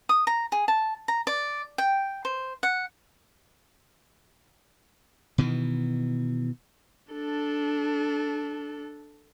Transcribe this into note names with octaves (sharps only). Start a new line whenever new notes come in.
D#6
A#5
G#4
A5
A#5
D5
G5
C5
F#5
B2 D#3 E3
D4 A4